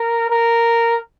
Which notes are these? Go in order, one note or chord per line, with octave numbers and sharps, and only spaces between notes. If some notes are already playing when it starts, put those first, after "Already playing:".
Already playing: A#4
A#4